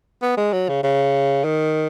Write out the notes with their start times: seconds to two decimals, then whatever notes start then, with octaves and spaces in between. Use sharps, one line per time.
0.22 B3
0.37 G#3
0.53 F#3
0.68 C#3
0.83 C#3
1.44 D#3